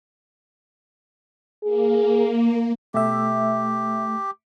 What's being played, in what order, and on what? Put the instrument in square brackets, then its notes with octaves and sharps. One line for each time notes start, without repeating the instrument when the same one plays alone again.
[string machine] A#3 [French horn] G#4
[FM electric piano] B2 E5 [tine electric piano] A3 [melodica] G4